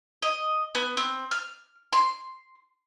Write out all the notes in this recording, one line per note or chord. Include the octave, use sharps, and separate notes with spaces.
D#5
B3
C4
F6
C6